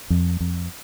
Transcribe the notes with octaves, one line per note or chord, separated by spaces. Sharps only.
F2
F2